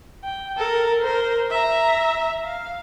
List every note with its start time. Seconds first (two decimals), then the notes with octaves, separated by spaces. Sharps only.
0.24 G5
0.58 A4 A#4
1.01 A#4 C5
1.51 E5 A#5
2.44 F5